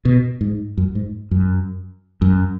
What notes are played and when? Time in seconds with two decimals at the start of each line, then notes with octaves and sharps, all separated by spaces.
0.05 B2
0.41 G#2
0.77 F#2
0.95 G#2
1.31 F#2
2.22 F#2